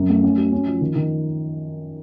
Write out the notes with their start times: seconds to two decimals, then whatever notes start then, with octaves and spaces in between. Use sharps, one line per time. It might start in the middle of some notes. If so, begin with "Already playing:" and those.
Already playing: F#2
0.09 A3
0.23 C#4
0.37 F#4
0.52 C#4
0.67 F3
0.81 D#3
0.95 D#3